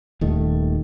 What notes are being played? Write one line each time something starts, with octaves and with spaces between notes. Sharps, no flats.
D#1 D#3 A3